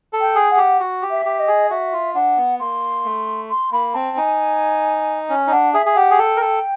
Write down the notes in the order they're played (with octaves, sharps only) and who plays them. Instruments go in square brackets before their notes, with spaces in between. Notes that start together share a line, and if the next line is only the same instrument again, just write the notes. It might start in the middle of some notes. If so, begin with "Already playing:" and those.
[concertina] A4
[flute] G5
[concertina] G#4
[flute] F#5
[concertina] G4
F#4
G4
[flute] E5
[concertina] G4
[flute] D#5
[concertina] G#4
[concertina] F#4 [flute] E5
[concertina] F4
[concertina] D4 [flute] F#5
[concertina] B3
[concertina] A#3 [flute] C6
[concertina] A3
[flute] C6
[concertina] A#3 [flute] B5
[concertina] C4 [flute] A5
[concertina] D#4 [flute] G#5
[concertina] C#4
D#4
[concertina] D4 [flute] F#5
[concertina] G#4 [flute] E5
[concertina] G#4
[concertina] G4 [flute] F#5
[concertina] G#4
[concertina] A4 [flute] G5
[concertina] A#4
A4